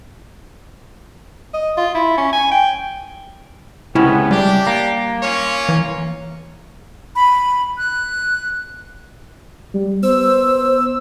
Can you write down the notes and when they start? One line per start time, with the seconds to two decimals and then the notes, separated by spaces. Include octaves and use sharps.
1.54 D#5
1.77 F4
1.95 E4
2.18 C#4
2.33 G#5
2.52 G5
3.95 C#2 C3 B3 C#4 E4
4.31 G3 D4 G4
4.67 A#3
5.23 C#4 F4 C#5
5.69 E3
7.16 B5
7.78 F#6
9.74 G3
10.03 B3 C5 E6